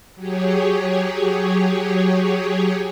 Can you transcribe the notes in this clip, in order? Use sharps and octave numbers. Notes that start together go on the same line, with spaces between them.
F#3 G4 G#4 C#5